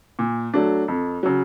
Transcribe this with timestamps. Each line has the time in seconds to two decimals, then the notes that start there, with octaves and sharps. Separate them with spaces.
0.19 A#2
0.54 F#3 A3 D4
0.88 F2
1.23 C#3 F#3